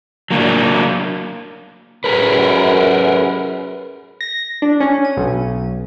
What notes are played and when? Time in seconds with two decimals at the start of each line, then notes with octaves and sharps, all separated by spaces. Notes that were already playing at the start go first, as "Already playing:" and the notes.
0.31 F#3 A#3 D4
2.04 F#2 G#4 A#4 B4
4.21 A#6
4.62 D4
4.80 C#4
5.05 D#7
5.17 B1